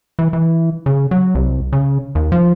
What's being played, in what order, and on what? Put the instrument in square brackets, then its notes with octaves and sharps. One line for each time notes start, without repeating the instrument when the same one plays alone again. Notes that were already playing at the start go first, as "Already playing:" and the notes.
[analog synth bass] E3
E3
C#3
F#3
C2
C#3
D#2
F3